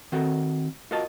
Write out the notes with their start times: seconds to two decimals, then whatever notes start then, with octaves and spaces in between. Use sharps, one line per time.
0.12 D#3 C4 F#4 A4 A#4
0.91 F4 F#4 A#4 D#5 A5